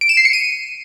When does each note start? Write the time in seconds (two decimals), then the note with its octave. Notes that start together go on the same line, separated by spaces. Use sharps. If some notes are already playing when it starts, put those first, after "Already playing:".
0.01 D7
0.09 E7
0.17 C7
0.25 C#7
0.33 D#7